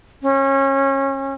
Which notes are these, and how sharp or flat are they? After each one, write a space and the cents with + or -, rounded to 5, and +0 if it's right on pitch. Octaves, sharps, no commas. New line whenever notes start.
C#4 -25